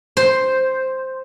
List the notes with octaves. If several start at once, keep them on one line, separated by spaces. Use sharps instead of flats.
C5